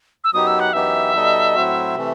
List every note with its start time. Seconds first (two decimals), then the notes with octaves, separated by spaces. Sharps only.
0.24 E6
0.33 F#2 F#3 B3 D#4 G4 D#6
0.47 E6
0.60 F#5
0.73 F#2 E3 B3 D#4 G4 E5
1.13 B2 G3 D#4 A4 D#5
1.55 A2 F#3 C4 F#4
1.95 C3 E3 A3